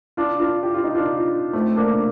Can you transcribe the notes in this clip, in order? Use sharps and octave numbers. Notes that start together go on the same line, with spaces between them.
D4 F4
D4 F4
G4
F4
D#4
D4 F4
A3 C4
A#3 D4